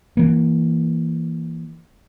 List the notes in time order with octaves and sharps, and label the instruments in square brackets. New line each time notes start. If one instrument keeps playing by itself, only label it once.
[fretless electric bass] E3 A#3